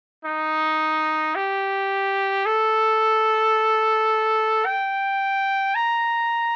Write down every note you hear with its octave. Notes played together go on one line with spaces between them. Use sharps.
D#4
G4
A4
G5
A#5